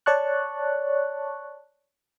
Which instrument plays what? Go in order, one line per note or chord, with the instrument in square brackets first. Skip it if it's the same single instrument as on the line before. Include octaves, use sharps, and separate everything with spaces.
[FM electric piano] C#5 D5 A5 C#6 F#6